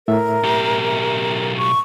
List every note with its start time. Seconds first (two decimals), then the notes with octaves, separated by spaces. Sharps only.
0.08 A2 A#4 E5
0.43 B1 G4
1.57 C#6